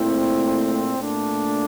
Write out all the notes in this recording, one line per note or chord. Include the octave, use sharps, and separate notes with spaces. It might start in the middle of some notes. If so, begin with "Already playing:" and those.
Already playing: A#2 A3 C4 E4
A#2 A3 D4